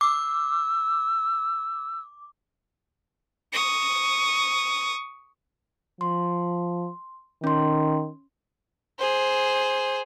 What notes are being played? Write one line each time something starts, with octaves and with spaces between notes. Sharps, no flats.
D6 E6
C#6 D#6
F3 C6
D#3 C#4 C6
G#4 C5